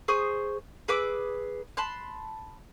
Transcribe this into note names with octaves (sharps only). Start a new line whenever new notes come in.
G#4 C5 C#6 D#6
G#4 B4 D6 E6
A5 B5 C6 F#6